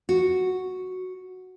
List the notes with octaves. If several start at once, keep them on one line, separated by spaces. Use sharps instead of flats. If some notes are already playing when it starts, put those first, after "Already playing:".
F#4